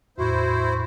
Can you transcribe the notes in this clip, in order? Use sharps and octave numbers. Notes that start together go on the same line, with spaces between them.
E2 A2 E4 F#4 C5